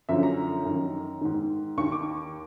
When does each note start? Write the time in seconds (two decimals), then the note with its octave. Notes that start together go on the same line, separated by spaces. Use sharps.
0.09 F#2 D3 F3 E5
0.23 A#5
0.65 F#2 D#3
1.21 G#2 D#3
1.78 D#2 D#3 C#6
1.92 D6